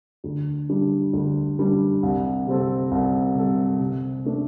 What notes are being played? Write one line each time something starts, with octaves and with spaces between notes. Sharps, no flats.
D2
D3 G3 D4
D2
D3 G3 D4
C2
C3 G3 C4 A4
C2
C3 G3 C4 A4
C3
A3 D4 A4